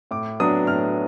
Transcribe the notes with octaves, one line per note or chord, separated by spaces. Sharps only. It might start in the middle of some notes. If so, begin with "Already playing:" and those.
A2 D6
F#3 B3 D4 D#6
A2 F6